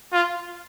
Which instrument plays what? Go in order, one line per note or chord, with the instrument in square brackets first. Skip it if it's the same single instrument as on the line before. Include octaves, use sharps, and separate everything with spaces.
[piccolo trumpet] F4